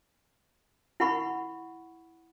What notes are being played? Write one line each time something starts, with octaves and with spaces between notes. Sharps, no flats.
E4 F#5 B5 C#6